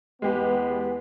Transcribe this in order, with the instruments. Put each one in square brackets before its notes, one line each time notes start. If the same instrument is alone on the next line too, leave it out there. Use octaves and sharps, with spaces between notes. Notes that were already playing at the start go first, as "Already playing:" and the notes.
[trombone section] E2 B3 [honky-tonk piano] G#3 G4 B4